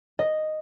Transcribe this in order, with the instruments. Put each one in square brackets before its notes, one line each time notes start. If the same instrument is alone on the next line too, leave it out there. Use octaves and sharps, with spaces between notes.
[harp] D#5